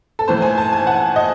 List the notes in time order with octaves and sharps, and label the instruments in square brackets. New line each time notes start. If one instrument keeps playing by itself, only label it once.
[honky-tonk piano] A4
A2 E3 C5
G#5
A5
G#5
F#5
D#5